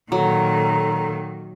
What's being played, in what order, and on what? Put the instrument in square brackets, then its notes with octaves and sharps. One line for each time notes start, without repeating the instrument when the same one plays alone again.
[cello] A#2 D#3 [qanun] F#3 [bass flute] A4 [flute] A#5